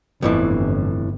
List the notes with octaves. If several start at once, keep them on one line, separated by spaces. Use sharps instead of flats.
G1 F2 A2 E3